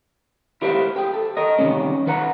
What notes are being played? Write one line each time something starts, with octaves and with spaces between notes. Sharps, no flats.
E4 G4 A#4 C5 D#5 F5
G4 G#4
A4
A#4 D#5
C3 D#3 E3 G3 A#3 C#4
D#3 B4 F#5 A#5